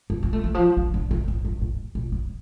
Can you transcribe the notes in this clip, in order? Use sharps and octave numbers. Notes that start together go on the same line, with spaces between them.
A#3
A#3
A3
E3
F3
D3
D3
C#3
A2
G2
A2
A#2
C#3